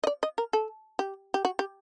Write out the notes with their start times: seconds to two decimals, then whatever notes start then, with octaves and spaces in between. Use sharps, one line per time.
0.04 D#5
0.07 D5
0.23 D#5
0.38 A#4
0.53 A4
0.99 G4
1.34 G4
1.45 F#4
1.59 G4